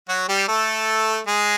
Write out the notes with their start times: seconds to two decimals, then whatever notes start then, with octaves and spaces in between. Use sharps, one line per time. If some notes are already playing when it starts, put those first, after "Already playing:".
0.09 F#3 F#4
0.29 G3 G4
0.48 A3 A4
1.27 G#3 G#4